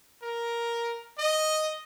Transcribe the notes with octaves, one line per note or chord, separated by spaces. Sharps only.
A#4
D#5